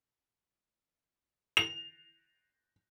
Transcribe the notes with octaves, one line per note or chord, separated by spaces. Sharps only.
F7